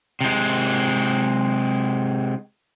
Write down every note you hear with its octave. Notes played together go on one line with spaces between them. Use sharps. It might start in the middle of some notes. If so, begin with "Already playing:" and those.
C3 G#3